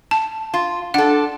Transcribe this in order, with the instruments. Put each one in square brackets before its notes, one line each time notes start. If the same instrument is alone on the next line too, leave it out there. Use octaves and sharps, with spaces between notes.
[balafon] A5
[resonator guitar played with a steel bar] F4
[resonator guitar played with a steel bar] D4 A4 [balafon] F#5